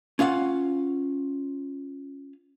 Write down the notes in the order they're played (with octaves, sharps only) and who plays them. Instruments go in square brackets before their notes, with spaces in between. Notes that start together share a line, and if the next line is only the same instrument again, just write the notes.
[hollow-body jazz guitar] C#4 F4 F5 F#5